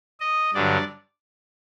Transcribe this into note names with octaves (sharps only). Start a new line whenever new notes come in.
D#5
G2 D3 F#3 D5